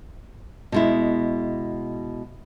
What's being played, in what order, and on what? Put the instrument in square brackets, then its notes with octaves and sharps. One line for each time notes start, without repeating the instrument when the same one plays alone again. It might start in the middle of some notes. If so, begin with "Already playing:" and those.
[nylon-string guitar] B2 G#3 E4